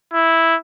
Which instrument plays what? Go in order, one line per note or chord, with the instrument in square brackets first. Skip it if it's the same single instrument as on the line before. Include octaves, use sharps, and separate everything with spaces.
[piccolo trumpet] E4